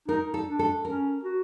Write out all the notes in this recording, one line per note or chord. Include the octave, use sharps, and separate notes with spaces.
D#4 A#4
A4
D4
A4
C#4 A#4
F#4